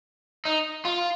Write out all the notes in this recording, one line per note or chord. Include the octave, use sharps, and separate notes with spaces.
D#4
F4